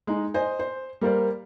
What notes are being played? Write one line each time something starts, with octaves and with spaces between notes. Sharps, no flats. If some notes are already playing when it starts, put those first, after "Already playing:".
G#3 D#4
C5 D#5 G#5
C5
G3 A#3 A#4 C5 D5